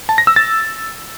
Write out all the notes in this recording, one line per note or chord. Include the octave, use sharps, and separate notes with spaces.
A5
A#6
E6
A6